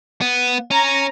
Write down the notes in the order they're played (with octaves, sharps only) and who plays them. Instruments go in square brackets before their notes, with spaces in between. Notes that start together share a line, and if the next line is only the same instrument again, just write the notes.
[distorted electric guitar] B3
[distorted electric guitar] C#4 [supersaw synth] A#5